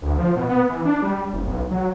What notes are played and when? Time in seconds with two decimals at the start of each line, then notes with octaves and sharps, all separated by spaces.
0.02 D2
0.18 F3
0.36 B2
0.49 B3
0.70 E3
0.85 D4
1.02 G3
1.33 F#1
1.45 B1
1.71 F#3